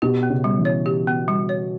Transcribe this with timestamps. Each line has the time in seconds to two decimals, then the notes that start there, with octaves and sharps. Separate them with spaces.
0.02 B2 G4
0.23 B3
0.30 C#3
0.44 G3
0.58 E3
0.65 C#5
0.86 G4
1.07 B3
1.28 G3
1.49 C#5